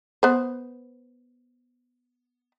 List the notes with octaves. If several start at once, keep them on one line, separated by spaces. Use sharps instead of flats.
B3 C5